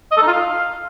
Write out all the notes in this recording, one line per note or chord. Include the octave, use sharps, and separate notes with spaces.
D#5
A4
D#4
F4
F5